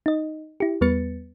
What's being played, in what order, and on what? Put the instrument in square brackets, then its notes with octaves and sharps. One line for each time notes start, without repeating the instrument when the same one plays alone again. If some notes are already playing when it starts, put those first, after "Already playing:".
[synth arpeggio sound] D#4 D#5
E4 G4
E2 G3 B3 B4 A6 C#7